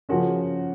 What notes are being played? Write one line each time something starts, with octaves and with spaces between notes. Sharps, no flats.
C#3 F3 A#3 C#4 F#4